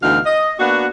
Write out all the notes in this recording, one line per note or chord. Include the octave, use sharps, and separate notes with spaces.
D2 B2 E3 D#4 F5
D#5
A#3 B3 D4 F#4